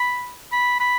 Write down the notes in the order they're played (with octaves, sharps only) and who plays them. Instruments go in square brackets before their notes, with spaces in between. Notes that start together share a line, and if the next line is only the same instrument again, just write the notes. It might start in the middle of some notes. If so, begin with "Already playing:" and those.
Already playing: [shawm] B5
B5
B5